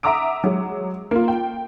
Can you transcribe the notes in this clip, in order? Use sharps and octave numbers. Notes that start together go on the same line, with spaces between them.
E5 F#5 A#5 D6 D#6 D7
F#3 G#3
A#3 F4
G5